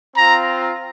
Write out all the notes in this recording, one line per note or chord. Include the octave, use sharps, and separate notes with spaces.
C4 F4 A#5